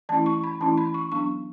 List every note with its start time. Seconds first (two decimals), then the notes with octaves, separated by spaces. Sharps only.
0.09 E3 A3 C#4 E4 A5
0.26 C#6
0.44 B5
0.60 E3 A3 C#4 E4 A5
0.77 B5
0.94 C#6
1.12 F#3 B3 D4 C#6